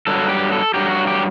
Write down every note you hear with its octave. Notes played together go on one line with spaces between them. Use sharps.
G2 F#3 A4
G4
A4
G2 F#3 G4
F#4
G4